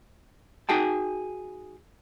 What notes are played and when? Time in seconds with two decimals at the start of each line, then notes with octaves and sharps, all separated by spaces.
0.69 D#4 F#4 G#4 G5 A5